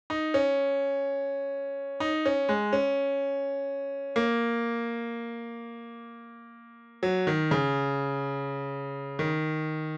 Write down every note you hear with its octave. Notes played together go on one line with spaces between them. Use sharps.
D#4
C#4
D#4
C#4
G#3
C#4
A#3
F#3
D#3
C#3
D#3